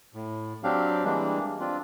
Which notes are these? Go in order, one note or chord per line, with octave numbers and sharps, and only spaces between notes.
A2
F#3 C4 D4 G4 F5
E3 G3 G#3 A#3 D4
C4 D4 F4